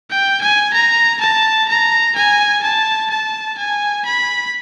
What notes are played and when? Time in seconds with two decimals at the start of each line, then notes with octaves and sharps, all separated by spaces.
0.11 G5
0.42 G#5
0.74 A#5
1.21 A5
1.68 A#5
2.16 G#5
2.63 A5
3.11 A5
3.58 G#5
4.06 B5